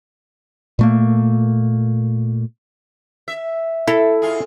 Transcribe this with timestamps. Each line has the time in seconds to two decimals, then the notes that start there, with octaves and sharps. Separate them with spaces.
0.79 A#2 A3 A#3
3.28 E5
3.88 E4 A4
4.22 G#2 F4 G#4